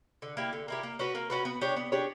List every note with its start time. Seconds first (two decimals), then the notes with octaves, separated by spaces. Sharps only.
0.22 D3
0.37 A#3 E4 G4
0.53 D3
0.68 A#3 E4 G4
0.83 A#3
0.99 C#4 F#4 B4
1.15 A#3
1.30 C#4 F#4 B4
1.45 B3
1.61 D4 G4 C#5
1.76 B3
1.92 D4 G4 C#5